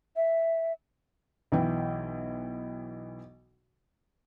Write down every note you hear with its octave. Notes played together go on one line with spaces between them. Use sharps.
E5
B1 E3 G5